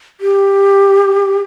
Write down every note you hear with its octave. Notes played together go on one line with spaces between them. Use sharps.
G4